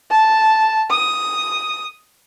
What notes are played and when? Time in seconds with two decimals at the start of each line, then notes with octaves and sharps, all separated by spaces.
0.11 A5
0.90 D#6